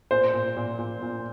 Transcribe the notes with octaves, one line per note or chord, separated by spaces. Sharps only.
A#2 C5
A#2
A#2
A#2
A#2